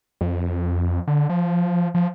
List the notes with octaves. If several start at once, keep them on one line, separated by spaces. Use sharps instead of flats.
F2
D3
F3
F3